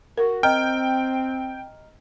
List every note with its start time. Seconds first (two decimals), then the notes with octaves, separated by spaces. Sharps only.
0.17 F#4 A#4
0.43 C4 D#5 G5 A#5 F6